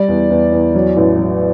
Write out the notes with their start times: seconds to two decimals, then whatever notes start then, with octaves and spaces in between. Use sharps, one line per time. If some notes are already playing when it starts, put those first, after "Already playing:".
Already playing: G3 D5
0.08 E2
0.30 E2
0.52 E2
0.75 F#3
0.97 A1
1.18 F#3